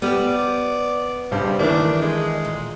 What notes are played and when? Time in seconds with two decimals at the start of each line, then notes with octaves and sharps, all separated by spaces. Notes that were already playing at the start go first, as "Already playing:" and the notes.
0.02 G3 B3
0.27 D5
1.31 G2 C#3 G3 C5
1.59 D#3 E3 A3 D4
2.02 G#3
2.45 A#2